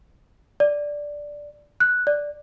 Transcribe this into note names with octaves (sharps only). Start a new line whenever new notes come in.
D5
F#6
D5